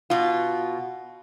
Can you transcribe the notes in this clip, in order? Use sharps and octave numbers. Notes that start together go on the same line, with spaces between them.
B2 F4